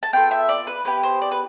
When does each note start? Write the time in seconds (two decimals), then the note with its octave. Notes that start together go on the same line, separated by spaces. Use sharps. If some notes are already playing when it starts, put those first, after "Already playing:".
0.03 A5
0.13 B3 F4 A4 G5
0.31 E5
0.49 D5
0.67 B4
0.85 B3 E4 G4 B4
1.03 C5
1.22 D5
1.31 B4